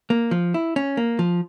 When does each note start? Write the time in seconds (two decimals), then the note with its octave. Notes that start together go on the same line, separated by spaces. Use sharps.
0.10 A#3
0.31 F3
0.54 E4
0.76 C#4
0.97 A#3
1.19 F3